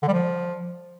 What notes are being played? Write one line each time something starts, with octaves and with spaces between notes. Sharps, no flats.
D3
G3
F3